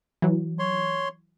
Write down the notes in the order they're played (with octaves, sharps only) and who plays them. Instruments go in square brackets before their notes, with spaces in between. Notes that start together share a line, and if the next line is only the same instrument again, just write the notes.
[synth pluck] E3 F#3
[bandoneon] C#5 C6